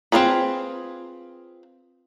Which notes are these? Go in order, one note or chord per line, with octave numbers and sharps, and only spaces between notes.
C4 C#4 F4 G#4 B4